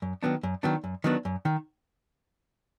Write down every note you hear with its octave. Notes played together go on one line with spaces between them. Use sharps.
F#2
D#3 F#3 B3 D4
F#2
D#3 F#3 B3 D4
F#2
D#3 F#3 B3 D4
F#2
D#3